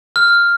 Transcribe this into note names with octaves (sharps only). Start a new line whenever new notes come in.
F6